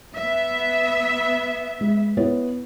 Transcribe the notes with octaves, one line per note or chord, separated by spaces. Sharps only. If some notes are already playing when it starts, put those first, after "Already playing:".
B3 E5
G#3
B3 E4 C#5